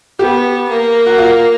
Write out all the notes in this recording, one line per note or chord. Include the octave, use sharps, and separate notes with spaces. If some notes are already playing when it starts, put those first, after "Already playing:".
B3 G4
A#3
F#4
F4